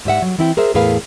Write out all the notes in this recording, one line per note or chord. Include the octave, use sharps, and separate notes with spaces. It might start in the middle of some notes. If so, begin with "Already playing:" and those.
G#2 G3 E5 F#5
F#3
E3 C4 E4 E5 G5
G#4 A#4 C5 E5
E2 A2 G#4 A#4 B4 F5